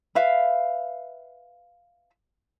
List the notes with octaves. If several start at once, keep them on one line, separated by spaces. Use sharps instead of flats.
B4 E5 F5